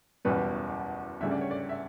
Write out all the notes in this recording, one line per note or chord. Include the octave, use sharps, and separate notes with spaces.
F#1 E2 B2 G3 B4
D2 C#3 G3 E5
D5
C#5
D5
E5